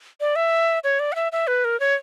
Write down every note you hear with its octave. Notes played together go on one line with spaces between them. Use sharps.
D5
E5
C#5
D5
F#5
E5
E5
B4
A#4
C#5